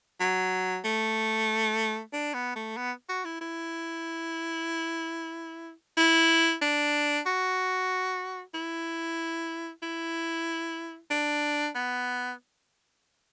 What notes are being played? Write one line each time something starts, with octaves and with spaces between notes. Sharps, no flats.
F#3
A3
D4
B3
A3
B3
F#4
E4
E4
E4
D4
F#4
E4
E4
D4
B3